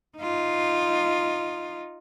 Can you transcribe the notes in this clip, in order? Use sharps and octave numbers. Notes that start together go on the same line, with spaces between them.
D#4 F4